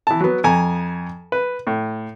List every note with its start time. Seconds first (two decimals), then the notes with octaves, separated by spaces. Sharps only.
0.07 E3 A5
0.20 F#3 B3
0.44 F2 G#5 A#5
1.32 B4
1.67 A2